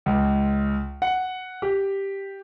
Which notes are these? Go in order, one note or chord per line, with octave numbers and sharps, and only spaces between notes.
C#2
F#5
G4